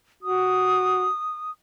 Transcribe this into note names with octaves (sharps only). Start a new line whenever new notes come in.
F#4 D#6